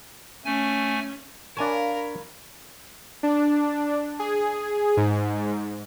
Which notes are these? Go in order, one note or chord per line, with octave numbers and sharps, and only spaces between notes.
A3 C#4 G#5
D4 A#4 C#5 F5 G#5 A5 B5
D4
G#4
G#2